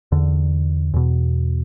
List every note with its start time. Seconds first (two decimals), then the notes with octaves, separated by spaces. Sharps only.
0.12 E2 D3
0.94 E2 B2